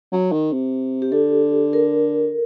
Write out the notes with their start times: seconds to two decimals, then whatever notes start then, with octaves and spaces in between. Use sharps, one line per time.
0.12 F#3
0.32 D#3
0.52 C3
1.02 G4
1.12 D3 A4
1.73 A#4